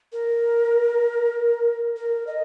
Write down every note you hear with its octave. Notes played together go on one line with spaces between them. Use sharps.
A#4
A#4
D#5